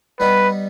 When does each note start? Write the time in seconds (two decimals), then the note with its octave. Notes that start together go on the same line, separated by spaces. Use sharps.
0.20 G3 B3 D#4 B4